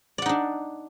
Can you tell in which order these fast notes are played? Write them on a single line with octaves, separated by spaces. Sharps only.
D5 F#5 D#4 D4